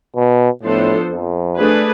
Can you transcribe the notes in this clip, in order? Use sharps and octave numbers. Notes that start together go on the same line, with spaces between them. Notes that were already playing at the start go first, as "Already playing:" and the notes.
B2
A2 F3 B3 D4 A4 C5
F2
A3 D4 G#4 B4